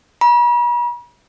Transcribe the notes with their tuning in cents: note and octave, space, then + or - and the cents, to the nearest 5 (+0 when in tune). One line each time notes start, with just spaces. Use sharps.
B5 -45